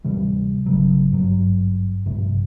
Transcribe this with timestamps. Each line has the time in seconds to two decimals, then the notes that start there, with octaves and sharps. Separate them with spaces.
0.04 D1 C3 E3 G3
0.66 G#1 C#3 F#3
1.11 G#1 G2 F#3
2.06 A#1 G2 C3